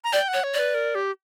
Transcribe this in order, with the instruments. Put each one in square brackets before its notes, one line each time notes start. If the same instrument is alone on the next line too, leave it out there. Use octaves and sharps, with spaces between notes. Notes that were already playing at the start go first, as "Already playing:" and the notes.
[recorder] A#5
[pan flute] D5 [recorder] G5
[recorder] F#5
[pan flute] C#5
[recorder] C#5
[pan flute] D5
[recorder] B4
A#4
G4